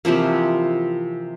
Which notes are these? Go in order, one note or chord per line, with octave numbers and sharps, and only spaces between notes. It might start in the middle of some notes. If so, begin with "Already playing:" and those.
C3 E3 F3 A#3